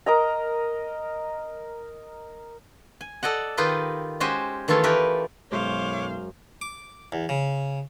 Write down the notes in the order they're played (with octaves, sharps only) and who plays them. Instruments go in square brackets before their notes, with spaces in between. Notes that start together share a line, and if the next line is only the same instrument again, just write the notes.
[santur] A#4 D#5 A#5
[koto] G#5
A4 D5 D#5 F#5
D#3 D#4 F4 G4 B4 D#5
G#3 C#4 F#4 G4 C5 G#5
D#3 E3 A3 F4 A4 C#5
A3 G4 A#4 B4
[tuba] B1 [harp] F#2 G#3 [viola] C5 F5 [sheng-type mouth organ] C#5 D6
[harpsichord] D6
E2
C#3